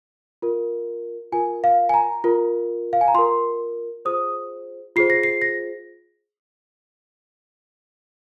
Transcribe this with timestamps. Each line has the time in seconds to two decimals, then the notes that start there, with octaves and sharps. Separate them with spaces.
0.42 F4 A#4
1.32 F4 A#4 G#5
1.64 F5
1.89 G#5
1.94 A#5
2.24 F4 A#4
2.93 F5
3.01 G#5
3.08 A#5
3.14 F4 A#4 C6
4.05 F4 G#4 C5 D#6
4.96 F4 G#4 C5 C7
5.10 A#6
5.23 C7
5.42 A#6